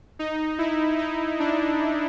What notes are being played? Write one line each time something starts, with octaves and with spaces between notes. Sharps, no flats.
D#4
E4
D#4
D4